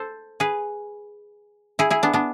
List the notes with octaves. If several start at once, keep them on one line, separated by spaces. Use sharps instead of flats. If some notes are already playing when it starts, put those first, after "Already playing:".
Already playing: A4 C5
G#4 B4
E4 G#4
E4 G#4
B3 D4
B3 D4